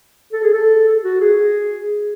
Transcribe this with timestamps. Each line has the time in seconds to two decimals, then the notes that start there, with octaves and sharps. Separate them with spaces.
0.33 A4
0.44 G#4
0.53 A4
1.04 F#4
1.21 G#4